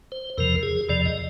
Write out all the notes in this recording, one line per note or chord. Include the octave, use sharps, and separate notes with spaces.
C5
E2 C3 F3 A#4
G#4
E2 C3 F3 D5
D#5